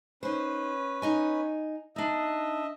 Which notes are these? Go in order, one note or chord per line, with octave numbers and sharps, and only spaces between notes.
C#4 D#4 B4 C5
D#4 D#5 G#5
D4 D#4 D#5 E5